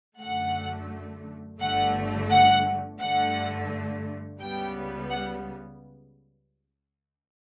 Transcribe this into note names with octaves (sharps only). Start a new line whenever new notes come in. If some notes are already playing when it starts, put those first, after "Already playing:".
F#2 D3 A3 F#5
G1 G2 D3 A3 F#5
F#5
G2 D3 A3 F#5
C#2 C#3 G3 B3 G5
F#5